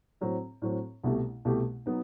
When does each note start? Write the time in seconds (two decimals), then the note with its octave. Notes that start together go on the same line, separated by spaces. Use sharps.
0.21 A2 F#3 C4
0.62 A2 F#3 C4
1.04 C2 B2 A3 E4 G4
1.45 C2 B2 A3 E4 G4
1.86 F#3 B3 D#4